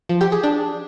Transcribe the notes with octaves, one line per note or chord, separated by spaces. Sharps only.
F3
G4
G#4
D4